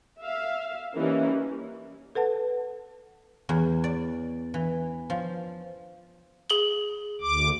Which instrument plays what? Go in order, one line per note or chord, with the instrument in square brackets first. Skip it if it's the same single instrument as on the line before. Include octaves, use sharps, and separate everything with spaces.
[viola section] E5 F5
E3 G3 A#3 C#4 D#4 E4
[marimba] A4 B4 F#5 A5
[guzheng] E2
D5
E3
F3
[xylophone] G#4 F#7 G7
[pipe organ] D2 D6